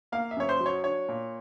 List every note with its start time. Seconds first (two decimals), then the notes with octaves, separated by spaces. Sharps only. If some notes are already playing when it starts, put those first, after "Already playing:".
0.12 A#3 F5
0.31 E5
0.36 F#2 C#5
0.49 C5
0.60 F#3
0.66 C#5
0.84 D4 C#5
1.08 A#2